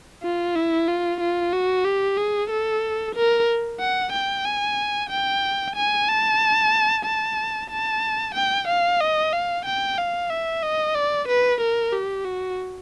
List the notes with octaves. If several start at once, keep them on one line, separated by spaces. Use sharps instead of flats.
F4
E4
F4
F4
F#4
G4
G#4
A4
A#4
F#5
G5
G#5
G5
G#5
A5
A5
A5
G5
F5
D#5
F5
G5
F5
E5
D#5
D5
B4
A#4
G4
F#4